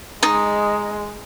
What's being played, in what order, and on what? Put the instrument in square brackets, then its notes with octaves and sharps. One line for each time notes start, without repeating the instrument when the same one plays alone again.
[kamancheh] G#3 [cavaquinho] D#4